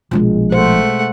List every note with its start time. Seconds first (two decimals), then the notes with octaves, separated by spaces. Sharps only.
0.11 A#1 B2 F3 G#3
0.52 A3 C5 F#5